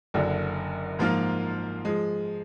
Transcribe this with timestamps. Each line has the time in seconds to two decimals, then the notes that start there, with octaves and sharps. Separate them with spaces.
0.14 F#1 F#2 D3
0.99 G#2 F3 A#3 F4
1.85 F3 G#3